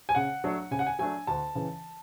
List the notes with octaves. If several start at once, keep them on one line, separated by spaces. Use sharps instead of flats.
G#5
C#3 F#5
F#3 A3 D4
C#3 G#5
F#5
G#5
F#3 A3 D4 G#5
D2 A5
C#3 E3